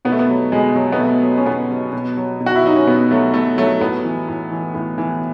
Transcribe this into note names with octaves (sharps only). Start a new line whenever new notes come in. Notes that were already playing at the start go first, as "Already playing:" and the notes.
B2 B3
A3
B3
F#3
B2 G#3
F#3
B3
B2 A3
F#3
C#4
B2 B3
F#3
B2
F#3
B2
F#4
E4
F#3 D#4
C#4
B2 B3
F#3 A3
B2 A3
F#3 A3
A2 B3
E3
A2
E3
A2
E3